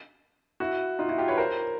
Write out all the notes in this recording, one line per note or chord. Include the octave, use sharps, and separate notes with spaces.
E4 F#4
D#4 F4
E4 F#4
F4 G4
B4 C#5
A#4 C5